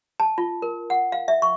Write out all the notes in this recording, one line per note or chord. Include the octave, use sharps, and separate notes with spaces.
A5
F4
A#4
F#5
F5
E5
C#6